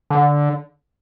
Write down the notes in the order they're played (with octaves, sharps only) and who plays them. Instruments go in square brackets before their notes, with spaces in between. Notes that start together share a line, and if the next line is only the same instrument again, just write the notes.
[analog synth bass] D3